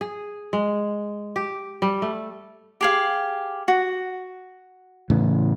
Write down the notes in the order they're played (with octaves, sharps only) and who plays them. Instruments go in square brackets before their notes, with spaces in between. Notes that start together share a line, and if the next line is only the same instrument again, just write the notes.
[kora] G#4
G#3
G4
G3
A3
[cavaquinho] G4 G#4 F5
F#4
[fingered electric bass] A2 C#3 E3